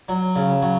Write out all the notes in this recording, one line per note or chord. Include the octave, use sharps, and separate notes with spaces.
F#3
C#3
F#3